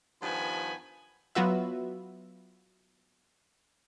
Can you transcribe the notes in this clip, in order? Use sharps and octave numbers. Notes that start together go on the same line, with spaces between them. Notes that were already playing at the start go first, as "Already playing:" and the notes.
G2 D#3 F3 B3 G#5 B5
F#3 B3 F4 F#4 B4 E5